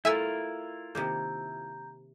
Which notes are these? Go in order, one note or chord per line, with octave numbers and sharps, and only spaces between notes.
A3 E4 F4 A#4 E5 G#5 E6
C3 D#3 A#3 A#5 G6